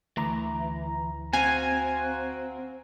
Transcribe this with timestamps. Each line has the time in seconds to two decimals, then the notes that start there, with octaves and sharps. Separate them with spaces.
0.17 D2 E3 A#5
1.33 C4 F#4 F5 G#5